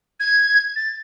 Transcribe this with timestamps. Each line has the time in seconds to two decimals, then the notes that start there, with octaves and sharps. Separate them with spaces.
0.20 G#6
0.76 A6